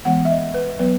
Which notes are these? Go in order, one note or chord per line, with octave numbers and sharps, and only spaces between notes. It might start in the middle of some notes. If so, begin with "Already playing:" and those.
E3 G#3 B3 F#5
E5
D#5
B4
F#3 B3 B4